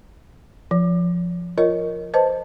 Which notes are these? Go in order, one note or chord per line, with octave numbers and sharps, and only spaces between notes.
F3
F4 A#4 C#5 D#5
B4 C5 D#5 A5